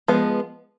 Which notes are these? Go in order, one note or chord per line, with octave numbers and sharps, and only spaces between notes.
F3 G#3 B3